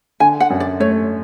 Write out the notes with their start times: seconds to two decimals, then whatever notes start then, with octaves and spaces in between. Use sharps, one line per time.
0.20 D3 G#5
0.40 F#5
0.50 F#2
0.60 D5
0.80 A3 C#5